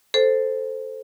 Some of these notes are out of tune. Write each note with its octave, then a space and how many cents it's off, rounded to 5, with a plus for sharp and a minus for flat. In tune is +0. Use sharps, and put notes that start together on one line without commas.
A4 +0 C5 +0